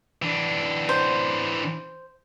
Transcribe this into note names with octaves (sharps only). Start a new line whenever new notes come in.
E3 D4
C5